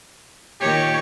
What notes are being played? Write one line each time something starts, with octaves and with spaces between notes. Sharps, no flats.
A#2 D#3 G4 C#5